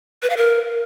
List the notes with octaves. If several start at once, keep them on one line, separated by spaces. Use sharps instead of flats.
B4
F5
A#4